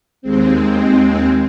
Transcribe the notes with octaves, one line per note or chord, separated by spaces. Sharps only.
D#2 G#3 C4